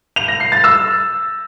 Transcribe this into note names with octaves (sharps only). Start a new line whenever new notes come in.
F7
A#6
C7
A6
E6